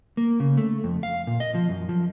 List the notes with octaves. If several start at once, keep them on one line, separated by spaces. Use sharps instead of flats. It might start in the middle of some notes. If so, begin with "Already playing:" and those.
A#3
C#3
A3
F2
F5
A#2
D#5
F3
F#2
F3